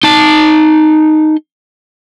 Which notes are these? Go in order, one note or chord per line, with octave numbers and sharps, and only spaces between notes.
D#4 A5